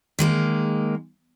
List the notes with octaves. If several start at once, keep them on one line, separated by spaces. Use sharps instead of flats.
D#3 G#3 A#3